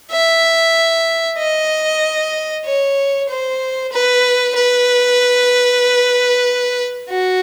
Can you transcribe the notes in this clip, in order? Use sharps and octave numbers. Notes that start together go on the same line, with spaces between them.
E5
D#5
C#5
C5
B4
B4
F#4